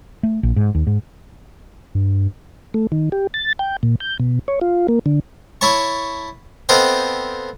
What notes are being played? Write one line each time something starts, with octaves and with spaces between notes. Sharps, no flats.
A3
A#1
G#2
D#2
G#2
G2
A3
D#3
G4
A6
G5
A#2
G6
B2
C#5
F4
A#3
D3
E4 C#5 A5 C#6
B3 C4 A4 D#5 F5 G5